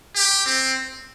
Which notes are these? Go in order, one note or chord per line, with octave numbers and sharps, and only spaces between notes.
G4
C4